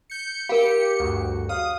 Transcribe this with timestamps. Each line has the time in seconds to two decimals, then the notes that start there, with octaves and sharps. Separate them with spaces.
0.10 G6 C#7
0.49 G4 A#4 F5 C#7
1.00 D2 G2 F#4
1.49 F5 F#5 D#6